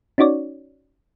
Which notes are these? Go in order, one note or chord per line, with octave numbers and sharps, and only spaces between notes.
C#4 D#4 F#4 C#5 D5